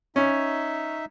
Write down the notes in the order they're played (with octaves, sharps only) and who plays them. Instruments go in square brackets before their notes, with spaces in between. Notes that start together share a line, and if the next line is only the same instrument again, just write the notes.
[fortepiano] C#4 [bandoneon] D#4 E5